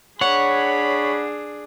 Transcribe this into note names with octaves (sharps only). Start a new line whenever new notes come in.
D4 G#4 C#5 F#5 B5